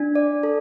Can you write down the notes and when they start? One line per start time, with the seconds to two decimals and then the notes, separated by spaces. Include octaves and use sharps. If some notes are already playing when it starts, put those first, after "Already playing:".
Already playing: D4
0.15 D5
0.43 A4